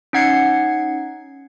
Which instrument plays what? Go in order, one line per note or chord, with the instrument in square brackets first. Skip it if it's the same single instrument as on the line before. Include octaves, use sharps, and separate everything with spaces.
[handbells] C#4 D#4 F#5 G#6 C7 C#7